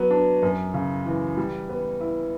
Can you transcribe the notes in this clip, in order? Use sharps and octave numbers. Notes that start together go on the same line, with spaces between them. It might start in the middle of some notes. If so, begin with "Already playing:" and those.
Already playing: F#3 B3
D4
F#2
C#3
E3
G3
B3
E4